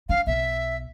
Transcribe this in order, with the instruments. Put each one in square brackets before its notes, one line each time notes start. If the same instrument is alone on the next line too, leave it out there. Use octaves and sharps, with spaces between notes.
[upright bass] D4 [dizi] F5
[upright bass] B1 [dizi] E5